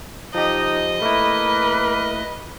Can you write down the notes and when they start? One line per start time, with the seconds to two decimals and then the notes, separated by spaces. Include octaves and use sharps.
0.34 F3 D#4 G4 D#5
1.02 A3 A#3 E4 B4